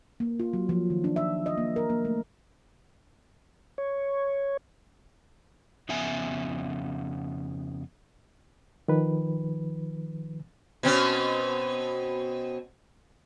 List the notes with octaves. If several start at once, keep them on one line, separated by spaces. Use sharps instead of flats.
A#3
F4
F#3
F3
D#3
D4
E5
D#5
A#3
A#4
A#3
A3
C#5
F2 C#3 B3 E5 G#5
D#3 F3 B4
B2 C4 C#4